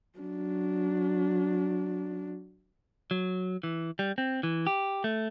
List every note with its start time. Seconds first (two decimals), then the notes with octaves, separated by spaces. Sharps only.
0.18 F#3 D4
3.11 F#3
3.63 E3
3.99 G3
4.18 C4
4.43 E3
4.67 G4
5.04 A3